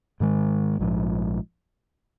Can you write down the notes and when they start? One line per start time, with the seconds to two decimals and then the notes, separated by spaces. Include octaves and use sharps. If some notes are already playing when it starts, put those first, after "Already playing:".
0.20 G#2 D#3 G#3
0.80 A#1 G#2 F3